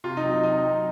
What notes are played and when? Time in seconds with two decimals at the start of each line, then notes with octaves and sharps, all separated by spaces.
0.04 C3 F4
0.17 D#4
0.23 F#3 C4
0.43 C3 D#4
0.62 F#3 C4